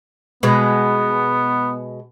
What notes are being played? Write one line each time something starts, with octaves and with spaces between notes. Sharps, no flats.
B2 G#3 B3